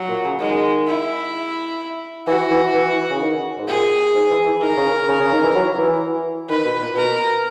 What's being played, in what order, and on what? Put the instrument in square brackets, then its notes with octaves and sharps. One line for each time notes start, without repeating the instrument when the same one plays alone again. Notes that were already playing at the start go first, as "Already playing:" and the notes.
Already playing: [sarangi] F#3
[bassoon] A#2
C#3
[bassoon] D#3 [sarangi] G#3
[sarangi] E4
[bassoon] E3 [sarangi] F#4
[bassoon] E3
E3
E3
C#3
D#3
G#2
[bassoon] A#2 [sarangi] G#4
[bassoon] G#2
E3
E3
[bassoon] D#3 [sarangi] A#4
[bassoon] C#3
C#3
C#3
D#3
E3
F#3
E3
[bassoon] D#3 [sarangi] B4
[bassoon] B2
A#2
[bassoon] B2 [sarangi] A#4